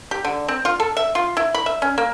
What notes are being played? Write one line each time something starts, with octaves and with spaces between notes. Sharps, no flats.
G4
D3
C4
F4
A4
E5
F4
E4
B5
E5
C#4
A#3